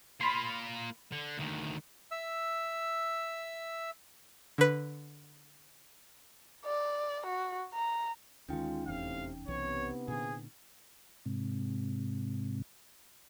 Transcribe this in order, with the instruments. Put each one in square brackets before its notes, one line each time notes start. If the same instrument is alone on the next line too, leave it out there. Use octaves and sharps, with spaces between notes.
[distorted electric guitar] A#3 F4 [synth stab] B5 C6
[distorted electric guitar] D3
D2 D#3
[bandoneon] E5 E6
[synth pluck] D3 B4
[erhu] D5
F#4
A#5
[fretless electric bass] D2 D#3 [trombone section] G#3 F4 [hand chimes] C#4 D#4 G5
[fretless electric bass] F1 E2 [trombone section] A2 C3 [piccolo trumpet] F5
[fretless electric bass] B1 E3 [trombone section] C3 B3 [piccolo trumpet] C#5
[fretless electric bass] A#2 D3 [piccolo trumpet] G#4
[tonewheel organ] G#2 C3